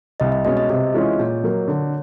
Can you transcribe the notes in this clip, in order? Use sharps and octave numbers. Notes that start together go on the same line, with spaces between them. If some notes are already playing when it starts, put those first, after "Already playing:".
C2 D#5
D#5
B2 G#3 C#4 D#5
D#5
C3 D#5
E3 G#3 C#4 F4
A#2 C#5
F#3 A#3
D3